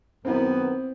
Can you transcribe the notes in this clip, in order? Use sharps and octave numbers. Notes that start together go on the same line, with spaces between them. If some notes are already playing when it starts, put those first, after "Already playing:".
F#2 D#3 B3 C4 E4